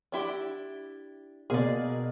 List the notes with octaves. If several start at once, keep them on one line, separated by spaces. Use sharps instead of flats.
D4 E4 G4
B2 A#3 G#4 D5